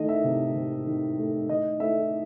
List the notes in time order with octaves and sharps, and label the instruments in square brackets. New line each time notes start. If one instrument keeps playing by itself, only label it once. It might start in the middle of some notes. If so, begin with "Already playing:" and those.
Already playing: [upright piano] D#3 A3 D#5
E5
C3
C3
D#3
A3
D#3 D#5
A3 E5